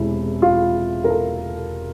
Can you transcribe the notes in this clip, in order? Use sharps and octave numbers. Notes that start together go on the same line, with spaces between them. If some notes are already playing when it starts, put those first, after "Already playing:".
Already playing: E1 E2 C3 E4
F4
A#4
A4